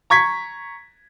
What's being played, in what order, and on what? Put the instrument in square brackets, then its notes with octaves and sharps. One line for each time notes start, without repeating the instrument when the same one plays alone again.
[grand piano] A#5 C#6 G#6 B6